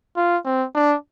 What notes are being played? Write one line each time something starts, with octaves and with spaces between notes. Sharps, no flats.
F4
C4
D4